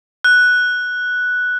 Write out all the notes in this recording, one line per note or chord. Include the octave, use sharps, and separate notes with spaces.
F#6